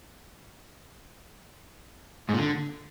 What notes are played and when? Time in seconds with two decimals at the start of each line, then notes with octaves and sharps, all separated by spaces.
2.29 G#2
2.34 A#2
2.39 D3